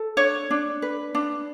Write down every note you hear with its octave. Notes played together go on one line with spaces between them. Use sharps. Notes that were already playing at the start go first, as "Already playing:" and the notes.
Already playing: A4
D4 C#5
D4
B4
D4